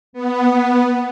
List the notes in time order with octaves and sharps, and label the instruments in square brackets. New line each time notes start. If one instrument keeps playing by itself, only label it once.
[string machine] B3